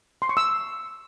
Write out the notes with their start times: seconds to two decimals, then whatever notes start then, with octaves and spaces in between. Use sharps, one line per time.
0.22 C6
0.29 C#6
0.37 E6